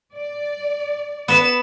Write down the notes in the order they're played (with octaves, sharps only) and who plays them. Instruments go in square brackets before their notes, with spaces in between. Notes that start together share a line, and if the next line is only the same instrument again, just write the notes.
[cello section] D5
[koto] B3 B4 [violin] E7